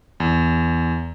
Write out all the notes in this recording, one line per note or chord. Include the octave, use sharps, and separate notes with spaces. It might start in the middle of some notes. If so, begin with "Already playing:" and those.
E2